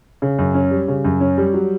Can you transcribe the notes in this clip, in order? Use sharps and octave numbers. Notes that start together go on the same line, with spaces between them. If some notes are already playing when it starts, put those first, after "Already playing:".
C#3
F#2
C#4
G3
C#3
F#2
C#4
G3
F#3